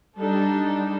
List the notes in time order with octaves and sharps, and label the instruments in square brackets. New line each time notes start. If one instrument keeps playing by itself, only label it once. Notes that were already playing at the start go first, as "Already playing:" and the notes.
[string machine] G3 [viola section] D4 D#4 A4